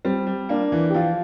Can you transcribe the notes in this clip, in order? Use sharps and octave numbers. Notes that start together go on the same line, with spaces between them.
G3 C4
G3
A#3 D4
E3
G4
F3 F4